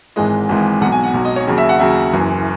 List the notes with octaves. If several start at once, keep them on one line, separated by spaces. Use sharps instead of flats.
G#1 G#2 E3 G#3 D#5
G#1 G#2 E3 G#3
B1 B2 F#3 F#5
G#5
F#5
B1 B2 F#3
D#5
C#5
D#2 C#3 F#3
E5
F#5
D#2 C#3 F#3 E5
F#1 F#2 E3